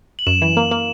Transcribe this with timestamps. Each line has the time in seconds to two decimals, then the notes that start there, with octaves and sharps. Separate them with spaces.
0.19 F#7
0.27 F#2 E7
0.42 E3
0.57 A#3
0.71 A#3